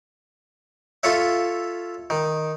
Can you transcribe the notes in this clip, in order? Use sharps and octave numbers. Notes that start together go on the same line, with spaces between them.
F4 A4 C#5 E5
D#3